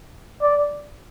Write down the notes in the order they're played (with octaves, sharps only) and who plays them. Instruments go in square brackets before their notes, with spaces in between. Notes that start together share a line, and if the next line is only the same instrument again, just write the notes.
[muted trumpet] D5